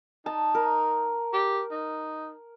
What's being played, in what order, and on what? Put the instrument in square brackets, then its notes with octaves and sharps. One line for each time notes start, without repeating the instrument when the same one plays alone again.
[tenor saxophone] D#4 [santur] A5
[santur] A#4
[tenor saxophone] G4
D#4